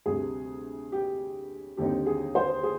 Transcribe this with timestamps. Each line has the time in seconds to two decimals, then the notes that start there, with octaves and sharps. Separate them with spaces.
0.06 D2 C3 G3 G#4
0.92 G4
1.77 D#2 D3 G3 C4 D#4 G4
2.06 G#4
2.35 C5
2.63 G#4